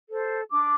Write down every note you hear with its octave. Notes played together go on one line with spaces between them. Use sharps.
A4 C5
D4 D6